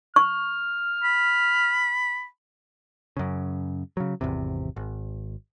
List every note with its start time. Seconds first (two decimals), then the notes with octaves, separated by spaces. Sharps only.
0.16 C#6 F6
1.04 B5
3.17 F#2 C#3
3.97 C#3 F#3
4.21 G#1 E2 C3
4.76 G#1